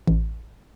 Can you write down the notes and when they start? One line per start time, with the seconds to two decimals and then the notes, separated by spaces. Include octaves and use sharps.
0.07 A1